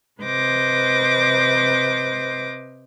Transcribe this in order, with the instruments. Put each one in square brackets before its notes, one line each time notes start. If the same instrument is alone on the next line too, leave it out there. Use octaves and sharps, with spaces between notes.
[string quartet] C3 B4 C5 D#5 D6 A#6